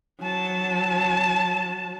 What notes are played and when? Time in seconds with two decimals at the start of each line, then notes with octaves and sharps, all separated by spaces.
0.22 F#3 A5